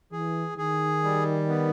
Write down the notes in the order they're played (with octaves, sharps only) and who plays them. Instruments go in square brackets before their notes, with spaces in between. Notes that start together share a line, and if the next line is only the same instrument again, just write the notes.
[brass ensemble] E3 [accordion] G#4
[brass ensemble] D#3 [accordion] G#4
[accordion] G3
B3